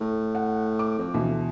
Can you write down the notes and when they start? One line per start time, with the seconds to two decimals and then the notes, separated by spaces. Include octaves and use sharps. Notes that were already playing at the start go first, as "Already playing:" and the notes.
0.01 A2
0.35 F#5
0.79 D6
0.99 F2
1.14 D2 B2 E3